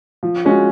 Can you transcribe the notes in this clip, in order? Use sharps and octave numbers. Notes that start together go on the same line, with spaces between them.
F3
G#3 C#4 F#4